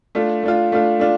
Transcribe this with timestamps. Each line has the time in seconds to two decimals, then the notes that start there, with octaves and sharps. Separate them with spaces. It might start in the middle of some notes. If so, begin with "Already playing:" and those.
0.15 A3 D4 F4
0.43 A3 D4 F4
0.72 A3 D4 F4
1.00 A3 D4 F4